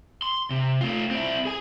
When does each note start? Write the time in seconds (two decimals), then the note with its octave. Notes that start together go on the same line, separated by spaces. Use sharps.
0.22 C6
0.51 C3
0.81 A3 F4
1.11 C4 E4
1.45 G#4 G#5